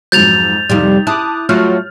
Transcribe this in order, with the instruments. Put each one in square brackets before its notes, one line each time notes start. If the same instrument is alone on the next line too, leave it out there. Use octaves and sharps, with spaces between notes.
[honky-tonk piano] F2 G#2 F#3 [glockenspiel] G6 A6 F7
[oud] F2 C3 G3 [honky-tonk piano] D#4 G4
[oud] E4 [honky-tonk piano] A5 [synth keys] D6 D#6 F#6
[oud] F#3 [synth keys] A3 F4 F#4 [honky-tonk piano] F6